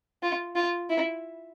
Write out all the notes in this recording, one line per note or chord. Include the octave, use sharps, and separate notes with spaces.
F4
F4
E4